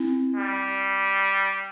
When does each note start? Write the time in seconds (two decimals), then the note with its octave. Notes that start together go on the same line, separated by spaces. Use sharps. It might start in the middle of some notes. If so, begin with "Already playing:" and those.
Already playing: C4 E4
0.36 G3